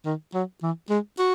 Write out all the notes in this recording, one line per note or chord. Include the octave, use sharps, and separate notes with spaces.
D#3
F#3
E3
G#3
F#4